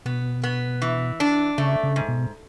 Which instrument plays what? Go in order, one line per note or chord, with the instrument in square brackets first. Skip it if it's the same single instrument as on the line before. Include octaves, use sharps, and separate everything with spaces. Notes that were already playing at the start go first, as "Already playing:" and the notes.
[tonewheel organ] B2 [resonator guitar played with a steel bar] B3
[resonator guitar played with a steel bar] B3
E3
D4
[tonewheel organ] C#3 [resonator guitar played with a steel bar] A3
[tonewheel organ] C#3
[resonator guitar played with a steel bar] G#2
[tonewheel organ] B2